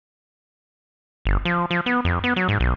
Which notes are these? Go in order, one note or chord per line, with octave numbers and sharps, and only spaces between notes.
G1
F3
F3
B3
F2
B3
F#3
G#2
B1